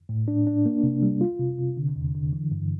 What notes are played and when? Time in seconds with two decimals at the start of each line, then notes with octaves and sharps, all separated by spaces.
0.09 A2
0.28 D4
0.47 D4
0.66 A#3
0.83 C3
1.03 G3
1.21 F4
1.39 C3
1.58 C3
1.77 D3
1.96 E2
2.15 D3
2.33 E3
2.52 G2